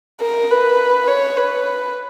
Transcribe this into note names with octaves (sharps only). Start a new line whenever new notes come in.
A#4
B4
C#5
B4